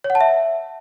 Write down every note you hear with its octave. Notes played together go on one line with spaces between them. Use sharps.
C#5
F#5
A5
E5